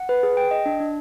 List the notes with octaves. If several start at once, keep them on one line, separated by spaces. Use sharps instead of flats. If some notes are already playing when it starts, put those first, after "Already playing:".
Already playing: F#5
B4
G#4
G5
D#5
D4
D4